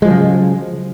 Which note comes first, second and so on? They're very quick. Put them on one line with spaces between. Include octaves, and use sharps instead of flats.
G#3 F3 F#3 C#3